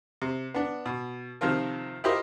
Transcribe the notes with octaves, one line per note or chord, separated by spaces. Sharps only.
C3
B3 D4
B2
C3 D#3 F3 F4 A#4
E4 F4 G4 A#4 C5 D#5